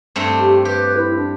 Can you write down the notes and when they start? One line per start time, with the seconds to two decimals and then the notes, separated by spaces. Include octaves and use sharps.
0.16 G2 A3 C4
0.40 G4
0.65 G4 B4
0.97 E4
1.16 D4